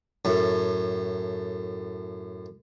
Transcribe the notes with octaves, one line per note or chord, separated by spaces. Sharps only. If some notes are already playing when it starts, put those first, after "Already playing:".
F#2 A2